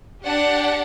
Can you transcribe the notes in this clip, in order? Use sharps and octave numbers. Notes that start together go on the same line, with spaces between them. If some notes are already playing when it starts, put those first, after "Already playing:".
D4 G4 F#5